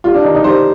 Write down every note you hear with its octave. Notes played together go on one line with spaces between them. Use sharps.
G3 F4
D4
D#3 D#4
D#4
G3 C5